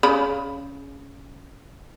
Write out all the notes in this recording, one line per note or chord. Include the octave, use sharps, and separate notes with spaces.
C#3 B5